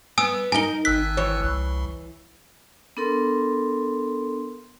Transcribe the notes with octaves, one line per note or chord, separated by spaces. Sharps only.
B3 G#5 D#6 E6
D#4 A#4 G#5 G7
G#1 E6 F#6 B6
E3 C#5
C2
B3 D4 A4 A#4 C6